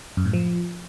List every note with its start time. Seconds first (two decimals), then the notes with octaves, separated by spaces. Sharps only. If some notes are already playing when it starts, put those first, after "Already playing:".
0.17 F#2
0.25 A2
0.33 F3